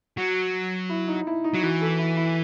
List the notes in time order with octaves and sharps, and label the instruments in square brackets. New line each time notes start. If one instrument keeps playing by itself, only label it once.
[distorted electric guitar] F#3 [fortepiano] F#4
[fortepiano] E4
D#4
E4
D#4
[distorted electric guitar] F#3
[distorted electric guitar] E3 [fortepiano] F#4
[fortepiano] A4
E4
E4